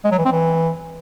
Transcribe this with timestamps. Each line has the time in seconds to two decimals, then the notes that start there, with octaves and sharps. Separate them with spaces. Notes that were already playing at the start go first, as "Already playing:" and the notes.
0.05 G#3
0.11 F#3
0.18 E3
0.25 C4
0.32 E3